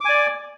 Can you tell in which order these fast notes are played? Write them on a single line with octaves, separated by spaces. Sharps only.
D6 G#5 D5